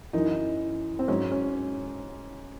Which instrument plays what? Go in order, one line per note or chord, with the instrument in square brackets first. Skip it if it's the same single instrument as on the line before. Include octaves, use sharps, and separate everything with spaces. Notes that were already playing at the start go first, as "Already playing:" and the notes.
[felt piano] F#2 E3 D#4
C4
G#2 F#3 C#4
C#4